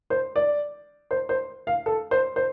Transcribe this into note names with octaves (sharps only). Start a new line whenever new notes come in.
C5
D5
C5
C5
F5
A4
C5
C5